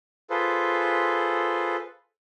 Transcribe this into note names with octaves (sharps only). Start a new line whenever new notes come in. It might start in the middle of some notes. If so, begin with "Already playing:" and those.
F4 G#4 A4 B4 C5